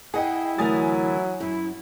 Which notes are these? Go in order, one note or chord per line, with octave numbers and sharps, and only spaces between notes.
E4 G#4 D#5 F#5 G5
D2 E3 F#3 A#4 G#5 D#6 A6
F#2 E4